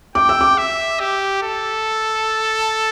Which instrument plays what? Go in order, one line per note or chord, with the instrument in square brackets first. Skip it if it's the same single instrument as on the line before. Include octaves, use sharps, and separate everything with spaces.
[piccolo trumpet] G5 [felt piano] D6
[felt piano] E6
D6
[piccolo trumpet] E5
G4
A4